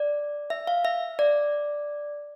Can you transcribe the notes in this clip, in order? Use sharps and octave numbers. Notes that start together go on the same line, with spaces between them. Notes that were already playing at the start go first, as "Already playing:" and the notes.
Already playing: D5
E5
F5
E5
D5